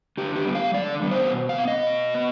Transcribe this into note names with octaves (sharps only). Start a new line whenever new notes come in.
D3 G4
G4
G3 B3
F5
D3 D5
G3 B3
C5
B2
F5
B3
D#5
B2
B3